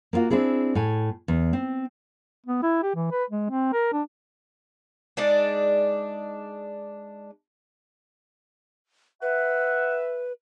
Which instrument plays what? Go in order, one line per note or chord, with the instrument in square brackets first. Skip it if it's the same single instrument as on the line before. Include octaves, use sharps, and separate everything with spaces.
[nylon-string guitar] A#3 B3 F4 F#4
C4 D4 E4 G#4
A2 G#5
E2
C4
[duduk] B3
E4
G4
E3
B4
G#3
C4
A#4
D4
[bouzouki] G#3 D4 D#4 D5
[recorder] B4 [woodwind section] E5 [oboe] F#5